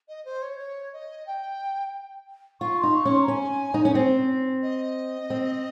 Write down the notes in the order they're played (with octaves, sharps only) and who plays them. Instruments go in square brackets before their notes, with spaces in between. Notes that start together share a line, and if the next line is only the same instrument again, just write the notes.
[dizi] D#5
C5
C#5
C#5
D#5
G5
[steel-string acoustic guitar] F4 [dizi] C#6
[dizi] C6
[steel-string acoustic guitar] D#4
[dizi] C#6
[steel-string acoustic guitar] C#4
[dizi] C6
A#5
[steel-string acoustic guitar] C#4 [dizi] G#5
[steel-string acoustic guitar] D#4
C#4
C4
[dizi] D#5
[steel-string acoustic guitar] C4